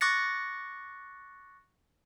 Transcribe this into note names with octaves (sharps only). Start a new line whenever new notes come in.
C#6 D6 F#6 A6 A#6 C#7